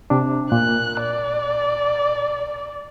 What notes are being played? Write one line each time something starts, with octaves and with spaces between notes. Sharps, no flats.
C3 D4
A#2 F#6
D5